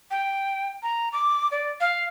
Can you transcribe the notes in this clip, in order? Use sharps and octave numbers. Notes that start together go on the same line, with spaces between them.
G5
A#5
D6
D5
F5